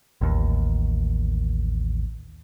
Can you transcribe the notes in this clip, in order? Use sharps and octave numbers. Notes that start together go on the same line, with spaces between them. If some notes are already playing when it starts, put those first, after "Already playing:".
A1 D#2